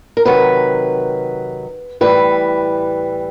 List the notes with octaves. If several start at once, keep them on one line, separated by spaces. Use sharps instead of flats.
A#4
C3 D#3 F#3 B4
A2 E3 G3 B4